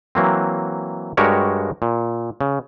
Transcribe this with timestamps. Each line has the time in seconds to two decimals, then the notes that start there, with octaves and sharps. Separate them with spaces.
0.15 E3 F#3 A#3 C4
1.17 G2 G#3 F#4 G4 A#4 C#5
1.82 A#2
2.41 C#3